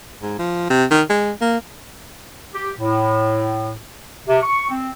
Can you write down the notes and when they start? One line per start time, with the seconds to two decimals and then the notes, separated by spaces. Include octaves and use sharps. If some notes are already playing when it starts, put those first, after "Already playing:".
0.22 G#2
0.39 F3
0.70 C3
0.91 D#3
1.10 G#3
1.41 A#3
2.54 G4
2.79 A2
4.27 C3
4.42 C#6
4.69 C4